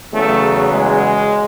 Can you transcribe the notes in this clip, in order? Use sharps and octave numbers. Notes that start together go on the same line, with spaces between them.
E2 C#3 F#3 A3
G#3